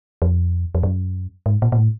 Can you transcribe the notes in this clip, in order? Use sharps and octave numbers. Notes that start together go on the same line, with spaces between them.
F2
F2
F#2
G#2
A#2
A#2
A2